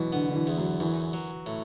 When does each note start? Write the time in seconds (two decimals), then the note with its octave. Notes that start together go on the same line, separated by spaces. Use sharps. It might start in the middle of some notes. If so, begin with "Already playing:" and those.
Already playing: B2 E3 F#3
0.12 D3 B3
0.30 D3
0.35 E3
0.47 E2
0.58 F#3
0.80 F#2 E3
1.13 F#3
1.46 A2